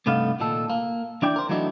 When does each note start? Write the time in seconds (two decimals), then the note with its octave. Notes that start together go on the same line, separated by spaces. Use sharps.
0.06 G2 C3 A3 B3 D#4 F5
0.40 A#2 D#3 A4
0.70 A#3
1.22 E3 D4 E4 D5 G5
1.36 A#4 C5
1.49 E3 F#3 A3 B3 D4 D#4